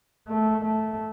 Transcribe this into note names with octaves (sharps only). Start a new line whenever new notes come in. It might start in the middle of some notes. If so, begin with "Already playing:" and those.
A3
A3